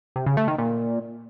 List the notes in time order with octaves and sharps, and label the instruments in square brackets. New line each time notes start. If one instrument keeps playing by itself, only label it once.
[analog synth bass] C3
C#3
A3
D#3
A#2